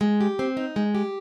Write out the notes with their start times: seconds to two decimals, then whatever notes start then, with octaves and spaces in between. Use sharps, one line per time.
0.01 G#3
0.21 G4
0.39 C4
0.57 D#4
0.76 G#3
0.95 G4